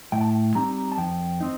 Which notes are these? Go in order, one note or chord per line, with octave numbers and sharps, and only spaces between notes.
A2 G5
A5
G5
G3 C4 D#4 A#5
A5
F2 G5
C4 D#4